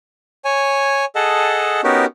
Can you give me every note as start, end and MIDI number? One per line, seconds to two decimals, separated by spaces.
0.45 1.05 73
0.45 1.05 80
1.15 1.81 68
1.15 1.81 69
1.15 1.81 75
1.15 1.81 78
1.15 1.81 81
1.84 2.05 59
1.84 2.05 61
1.84 2.05 63
1.84 2.05 66
1.84 2.05 67
1.84 2.05 70